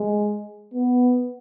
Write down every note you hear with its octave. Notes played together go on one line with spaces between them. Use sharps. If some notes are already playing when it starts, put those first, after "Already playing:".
Already playing: G#3
B3